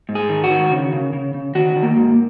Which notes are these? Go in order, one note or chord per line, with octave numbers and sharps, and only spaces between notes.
G#2
G#4
D#3
F#4
D#3
C#3
C#3
C#3
C#3
D#3 F#4
D#3
A#3
G#2